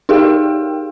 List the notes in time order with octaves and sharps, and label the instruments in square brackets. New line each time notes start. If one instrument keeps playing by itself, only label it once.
[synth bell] D#4 G4 G#4 A#4 F5 G5